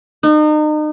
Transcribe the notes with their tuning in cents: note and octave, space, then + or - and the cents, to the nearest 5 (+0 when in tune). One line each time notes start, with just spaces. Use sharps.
D#4 -35